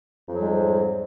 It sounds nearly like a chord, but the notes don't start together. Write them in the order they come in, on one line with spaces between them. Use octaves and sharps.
F2 F#3 G3 G#2